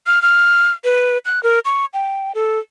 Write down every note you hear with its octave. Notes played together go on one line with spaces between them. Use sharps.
F6
F6
B4
F#6
A#4
C#6
G5
A4